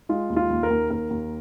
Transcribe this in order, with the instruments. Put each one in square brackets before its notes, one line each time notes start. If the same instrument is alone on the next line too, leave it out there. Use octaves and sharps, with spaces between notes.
[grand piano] G#3 F4
D#2
F4
D#2
A#4
D#2
D#2 A#4
D#2